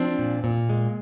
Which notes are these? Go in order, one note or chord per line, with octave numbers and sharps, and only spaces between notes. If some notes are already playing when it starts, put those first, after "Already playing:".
Already playing: F3 C4 D4
A#2
A#2
G#3